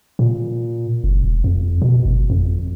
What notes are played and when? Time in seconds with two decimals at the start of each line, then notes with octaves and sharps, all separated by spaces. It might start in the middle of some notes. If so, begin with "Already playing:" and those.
0.19 A#2
1.04 F#1
1.24 E1
1.44 F2
1.82 B2
2.05 G1
2.30 F2